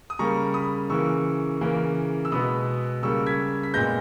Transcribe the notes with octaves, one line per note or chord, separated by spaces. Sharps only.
D#6
C#3 G3 A#3 A#5 C#6
B5 D#6
C#3 E3 A#3 C#6 E6
C#3 E3 A#3
E6
B2 G#3 B3 B5 D#6
C#3 G3 A#3 C#6 E6
G#6 B6
B6
A#2 G#3 B3 G6 A#6